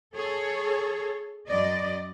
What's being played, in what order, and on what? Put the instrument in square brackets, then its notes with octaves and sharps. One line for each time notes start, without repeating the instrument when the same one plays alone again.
[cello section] G#4 A4 C#5
F#2 D5 D#5